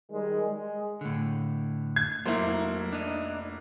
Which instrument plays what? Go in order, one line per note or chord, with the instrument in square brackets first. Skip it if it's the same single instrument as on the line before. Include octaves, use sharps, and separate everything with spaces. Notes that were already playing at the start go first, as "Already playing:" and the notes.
[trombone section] D#3 G3 G#3
G#3
[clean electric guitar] A2 D3
[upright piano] G#6
[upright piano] F1 A#3 E4 [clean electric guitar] F#3 C5
[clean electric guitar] D4 D#4